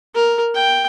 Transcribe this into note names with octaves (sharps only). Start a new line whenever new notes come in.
A#4
G5